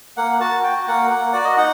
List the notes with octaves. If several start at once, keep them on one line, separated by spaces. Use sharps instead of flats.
A#3 F#5
F#4 A5
F#4 G5
A#3 F#5
A#3
F#4 D5
D#5
D#4 F#5